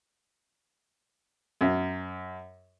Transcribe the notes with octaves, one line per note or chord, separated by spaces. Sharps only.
F#2